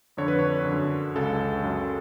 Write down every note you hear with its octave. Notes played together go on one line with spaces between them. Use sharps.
F2 D3 C#5
B4
C#5
D3
F#2
C#2 C#3 A4
F#2 C#3